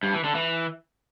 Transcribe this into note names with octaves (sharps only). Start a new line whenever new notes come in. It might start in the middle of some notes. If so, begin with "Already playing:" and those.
G2
E3
D3
E3